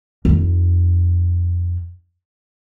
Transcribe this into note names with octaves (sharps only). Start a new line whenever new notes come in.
F2 D#4